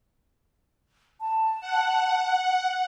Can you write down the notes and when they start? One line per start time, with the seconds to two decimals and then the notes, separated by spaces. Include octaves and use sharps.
1.21 A5
1.61 F#5